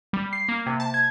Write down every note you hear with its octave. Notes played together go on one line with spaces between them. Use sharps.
G3
C7
A#3
C3
A5
G#6